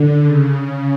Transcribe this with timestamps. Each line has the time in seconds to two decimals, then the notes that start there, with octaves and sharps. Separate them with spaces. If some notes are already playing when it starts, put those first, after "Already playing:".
Already playing: D3
0.24 C#3